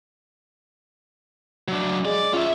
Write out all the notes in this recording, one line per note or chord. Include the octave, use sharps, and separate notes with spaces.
F#3 D4
G#3 D5
C#4 F4 E5